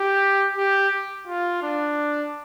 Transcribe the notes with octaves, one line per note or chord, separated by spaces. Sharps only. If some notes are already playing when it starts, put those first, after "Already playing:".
Already playing: G4
G4
F4
D4